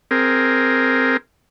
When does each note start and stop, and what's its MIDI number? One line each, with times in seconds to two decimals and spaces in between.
0.11 1.17 60
0.11 1.17 68
0.11 1.17 70